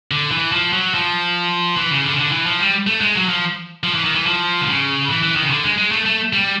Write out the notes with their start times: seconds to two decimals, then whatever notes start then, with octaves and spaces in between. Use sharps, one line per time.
0.11 D3
0.31 E3
0.52 F3
0.73 F#3
0.94 F3
1.76 E3
1.91 C#3
2.04 D3
2.13 C#3
2.19 D3
2.32 E3
2.46 F3
2.59 G3
2.87 A3
3.01 G#3
3.15 F#3
3.29 F3
3.83 F3
3.94 E3
4.04 D#3
4.15 E3
4.26 F3
4.62 D3
4.67 C#3
5.08 E3
5.23 E3
5.36 D#3
5.43 C#3
5.50 D3
5.64 G#3
5.78 G#3
5.92 A3
6.05 A3
6.33 G3